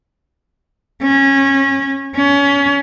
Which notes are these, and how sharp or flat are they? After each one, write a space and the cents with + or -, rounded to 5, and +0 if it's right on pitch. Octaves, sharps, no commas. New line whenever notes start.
C#4 -20
C#4 +25